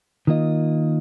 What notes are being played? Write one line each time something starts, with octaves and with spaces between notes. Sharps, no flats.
D#3 A#3 F4 D#5